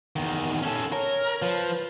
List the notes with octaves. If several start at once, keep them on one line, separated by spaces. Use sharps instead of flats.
E2 D#3
C#4 A4
A#4 C#5
F3 B4